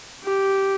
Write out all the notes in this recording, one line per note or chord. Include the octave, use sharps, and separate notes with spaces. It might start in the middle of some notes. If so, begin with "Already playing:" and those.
G4